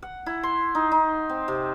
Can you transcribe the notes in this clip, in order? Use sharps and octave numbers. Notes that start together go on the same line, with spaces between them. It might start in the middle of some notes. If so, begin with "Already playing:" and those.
F#5
E4
C6
D#4
D#4
C4
C3